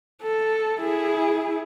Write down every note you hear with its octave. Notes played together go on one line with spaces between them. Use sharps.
A4
E4 G#4